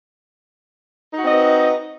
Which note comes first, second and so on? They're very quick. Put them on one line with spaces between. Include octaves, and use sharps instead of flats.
D#4 F#4 C4 D#5 B4